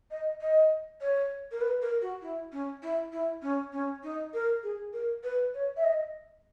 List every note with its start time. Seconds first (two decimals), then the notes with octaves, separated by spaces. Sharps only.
0.11 D#5
0.41 D#5
1.01 C#5
1.52 A#4
1.61 B4
1.82 A#4
2.02 F#4
2.22 E4
2.52 C#4
2.83 E4
3.12 E4
3.43 C#4
3.73 C#4
4.03 D#4
4.34 A#4
4.63 G#4
4.93 A#4
5.24 B4
5.55 C#5
5.77 E5
5.84 D#5